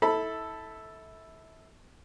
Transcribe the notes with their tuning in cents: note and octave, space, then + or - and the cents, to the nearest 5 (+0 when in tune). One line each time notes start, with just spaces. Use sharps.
E4 -30 A4 +0 B5 +0